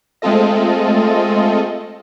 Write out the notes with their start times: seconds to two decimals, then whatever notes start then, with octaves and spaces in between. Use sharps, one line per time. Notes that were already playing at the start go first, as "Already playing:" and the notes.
0.22 G#3 A3 C4 F4 A4 D#5